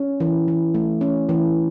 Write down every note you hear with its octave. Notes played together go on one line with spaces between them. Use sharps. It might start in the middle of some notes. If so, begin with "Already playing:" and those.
Already playing: C#4
E3
E3
A3
C#4
E3